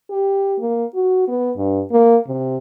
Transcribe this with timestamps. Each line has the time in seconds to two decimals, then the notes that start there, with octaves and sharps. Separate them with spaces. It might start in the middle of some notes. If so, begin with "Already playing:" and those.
0.10 G4
0.60 A#3
0.95 F#4
1.28 B3
1.56 G2
1.92 A#3
2.27 C3